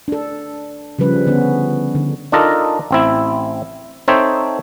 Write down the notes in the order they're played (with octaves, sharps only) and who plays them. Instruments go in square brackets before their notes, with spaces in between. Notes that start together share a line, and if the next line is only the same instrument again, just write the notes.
[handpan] D4 A4
C#3 F3 G3 B4
D3 B3 C#4
D3
[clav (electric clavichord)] D4 D#4 F4 A4 A#4 D#5
A1 C4 E4
C4 D#4 A4 C5 C#5 E5